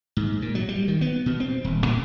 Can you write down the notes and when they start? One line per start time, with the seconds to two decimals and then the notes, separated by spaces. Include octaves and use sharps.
0.17 G#2
0.42 A#2
0.55 F#3
0.68 G3
0.88 D#3
1.01 B3
1.26 B2
1.40 C4
1.64 D#1
1.86 A2